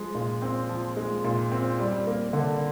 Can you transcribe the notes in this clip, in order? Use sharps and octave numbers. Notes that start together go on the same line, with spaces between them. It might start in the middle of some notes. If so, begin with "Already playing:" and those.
Already playing: F3 G#3
A#2
C4
F3
G#3
A#2
C4
G3
A#3
D3